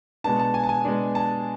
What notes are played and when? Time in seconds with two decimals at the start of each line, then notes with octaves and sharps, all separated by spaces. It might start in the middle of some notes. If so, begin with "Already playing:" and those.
0.24 B2 G#3 B3 D4 A5
0.40 A5
0.54 G#5
0.64 A5
0.69 G#5
0.84 B2 G#3 B3 D4
1.15 A5